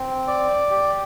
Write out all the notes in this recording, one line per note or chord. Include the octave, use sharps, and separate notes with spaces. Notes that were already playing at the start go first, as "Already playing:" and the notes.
Already playing: C4
D5
G4